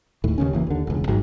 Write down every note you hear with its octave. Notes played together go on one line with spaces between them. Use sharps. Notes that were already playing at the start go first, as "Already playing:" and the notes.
D#2 A2
D#2 C#3 C#4
F#1 E3 A#3
D#2 D3
E1 C#2
G#1 G#2 F#3